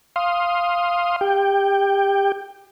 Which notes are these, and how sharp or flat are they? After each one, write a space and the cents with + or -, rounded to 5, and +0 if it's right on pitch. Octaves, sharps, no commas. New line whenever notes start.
F5 +0 C6 +10 D#6 +0
G4 +25 G5 +0